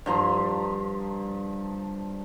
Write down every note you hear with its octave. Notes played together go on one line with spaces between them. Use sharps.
G2 F3 A#5 C6